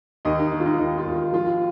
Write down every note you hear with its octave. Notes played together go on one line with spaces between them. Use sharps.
D#2 D#4 D#5
D#4
D#3 D#4
F4
D#4
D#2 D#4
F4
D#2
F4
F3 F4